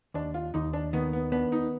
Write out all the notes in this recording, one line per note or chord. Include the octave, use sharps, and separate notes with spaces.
D#2 D4
F4
D#2 D#4
D4
D#3 B3
B3
B3 D4
D#4